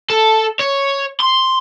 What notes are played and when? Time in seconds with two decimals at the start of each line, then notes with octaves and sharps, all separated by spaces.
0.10 A4
0.59 C#5
1.20 C6